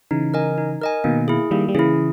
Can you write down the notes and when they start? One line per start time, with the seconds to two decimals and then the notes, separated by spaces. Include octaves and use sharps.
0.11 C#3 E3 D#4
0.34 A#4 D#5 G#5
0.58 D#4
0.82 A#4 D#5 G#5
1.04 B2 D#3 A#3
1.28 E4 G#4
1.51 D#3 G3 A#3
1.68 G3
1.75 C#3 E3 E4 G#4